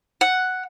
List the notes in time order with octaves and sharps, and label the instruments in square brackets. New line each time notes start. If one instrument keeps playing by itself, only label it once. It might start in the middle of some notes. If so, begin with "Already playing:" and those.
[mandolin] F#5